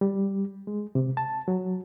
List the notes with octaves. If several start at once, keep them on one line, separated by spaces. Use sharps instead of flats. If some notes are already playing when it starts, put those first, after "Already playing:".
G3
G#3
C3
A5
F#3